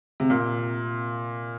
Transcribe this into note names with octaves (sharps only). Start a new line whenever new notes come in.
C3
A#2